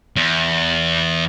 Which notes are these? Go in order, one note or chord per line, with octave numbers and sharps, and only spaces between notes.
E2